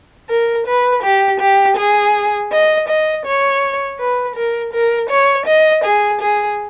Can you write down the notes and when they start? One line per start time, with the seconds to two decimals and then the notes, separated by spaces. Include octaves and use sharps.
0.30 A#4
0.67 B4
1.03 G4
1.40 G4
1.77 G#4
2.52 D#5
2.89 D#5
3.26 C#5
4.00 B4
4.36 A#4
4.73 A#4
5.10 C#5
5.46 D#5
5.84 G#4
6.21 G#4